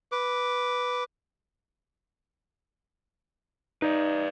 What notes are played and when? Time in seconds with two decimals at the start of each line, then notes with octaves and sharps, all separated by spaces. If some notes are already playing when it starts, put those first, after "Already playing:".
0.12 B4 D6
3.82 D#4 B4 D5